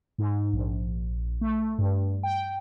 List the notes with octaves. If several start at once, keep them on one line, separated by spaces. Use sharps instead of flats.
G#2
A#1
A3
G2
G5